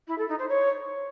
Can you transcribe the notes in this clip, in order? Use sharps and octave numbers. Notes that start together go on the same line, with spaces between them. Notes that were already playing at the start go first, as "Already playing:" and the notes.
E4
A4
D#4
C5
C#5